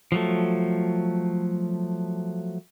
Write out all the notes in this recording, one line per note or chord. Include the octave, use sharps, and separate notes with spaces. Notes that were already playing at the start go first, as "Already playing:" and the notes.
F3 F#3 A3